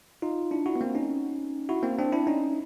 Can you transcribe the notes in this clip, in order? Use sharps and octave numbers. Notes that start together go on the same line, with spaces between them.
D#4 F4
D4 E4
E4 F#4
B3
A#3 C4
C#4 D#4
E4 F#4
A#3 C4
C4 D4
D4 E4
C#4 D#4